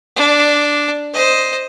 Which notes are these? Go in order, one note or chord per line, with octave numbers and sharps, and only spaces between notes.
D4
C5 D#5